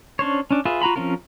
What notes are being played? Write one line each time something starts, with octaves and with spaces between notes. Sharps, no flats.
C#4 D4 C5 C#5
C#4 D4
F4 G#4 B4 E5
F4 F#4 A#5 B5
F3 C4 C#4 F4 A#4